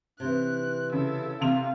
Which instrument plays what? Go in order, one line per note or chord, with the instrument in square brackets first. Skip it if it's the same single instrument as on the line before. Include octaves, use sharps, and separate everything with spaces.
[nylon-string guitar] C3 E3 [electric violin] F#6
[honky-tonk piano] C#3 [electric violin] E4 A4
[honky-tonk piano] C3 F7 [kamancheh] F5